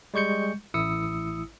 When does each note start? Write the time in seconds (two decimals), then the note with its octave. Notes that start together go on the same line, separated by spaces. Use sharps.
0.14 G3 G#3 C#6 G6 C#7
0.74 A1 E4 D#6 E6 C#7